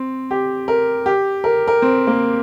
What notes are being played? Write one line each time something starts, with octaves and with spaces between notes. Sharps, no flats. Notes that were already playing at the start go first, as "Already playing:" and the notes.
Already playing: C4
G4
A#4
G4
A#4
A#4
C4
A#3